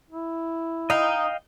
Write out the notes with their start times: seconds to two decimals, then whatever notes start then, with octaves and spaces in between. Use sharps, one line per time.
0.10 E4
0.90 D#4 D#5 F5 G5